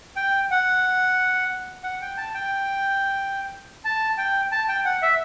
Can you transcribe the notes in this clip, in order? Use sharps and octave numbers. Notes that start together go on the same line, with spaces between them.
G5
F#5
F#5
G5
A5
G5
A5
G5
A5
G5
F#5
E5